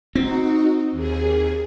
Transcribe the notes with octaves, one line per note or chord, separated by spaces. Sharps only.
C4 D#4 F#4
D#2 G#4